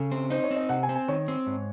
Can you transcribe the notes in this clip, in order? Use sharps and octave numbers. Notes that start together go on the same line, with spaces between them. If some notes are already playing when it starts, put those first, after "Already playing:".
Already playing: C#3 A4
C4
D#4 C5
C#5
C4
D#5
C3 F#5
G#5
C4
G#5
D#3 C#5
C4
G#2